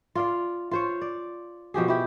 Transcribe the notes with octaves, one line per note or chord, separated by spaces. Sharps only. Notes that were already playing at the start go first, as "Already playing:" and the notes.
F4 D5 F5
F4 C5 C#5
D5
B2 F3 G4 G#4
E4 G4